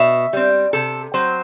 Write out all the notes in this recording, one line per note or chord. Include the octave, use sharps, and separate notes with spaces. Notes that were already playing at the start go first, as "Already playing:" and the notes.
Already playing: B2 E5
G3 C4
C3 A4
F#3 C4 C5